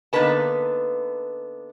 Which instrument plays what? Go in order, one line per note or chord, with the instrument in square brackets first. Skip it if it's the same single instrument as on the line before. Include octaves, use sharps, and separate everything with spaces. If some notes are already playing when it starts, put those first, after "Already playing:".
[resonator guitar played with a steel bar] D3 A#3 B3 D#4 B4 A5